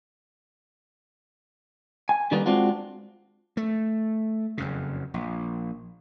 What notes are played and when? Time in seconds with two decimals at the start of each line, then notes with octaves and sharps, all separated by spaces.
2.09 G#5
2.31 D3 D#3 G3 A#3 D#4 B4
2.46 G#3 C4 D4 F4 F#4
3.57 A3
4.58 F#1 F2 C#3
5.14 A#1